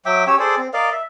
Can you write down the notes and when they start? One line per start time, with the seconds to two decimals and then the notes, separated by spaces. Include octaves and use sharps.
0.05 F#3 E5 G5 D6
0.27 C#4 G4 C#5 E6
0.39 G#4 A4 C5 D5
0.58 C4
0.74 A#4 D5 D#5 F5
0.92 E5